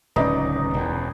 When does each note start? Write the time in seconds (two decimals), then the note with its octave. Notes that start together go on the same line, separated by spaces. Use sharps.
0.16 D1 C#2 C#4 D#4 B4 D5 D#5
0.74 E1 E2